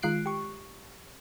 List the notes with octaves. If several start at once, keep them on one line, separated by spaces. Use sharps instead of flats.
D#3 G#3 F4 F#6 C7 D7
G4 C#6